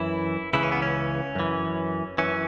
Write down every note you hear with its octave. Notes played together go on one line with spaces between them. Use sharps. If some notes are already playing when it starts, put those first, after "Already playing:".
Already playing: F#2 E3 E4
C#2 C#3 E3 E4
C#4
B3
C#4
F#2 E3
F#2 E3 C#4